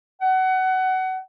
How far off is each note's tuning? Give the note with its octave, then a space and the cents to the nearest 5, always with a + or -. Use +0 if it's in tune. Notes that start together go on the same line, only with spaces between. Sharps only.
F#5 +20